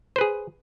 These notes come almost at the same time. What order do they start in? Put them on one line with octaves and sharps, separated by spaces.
C5 B4 G#4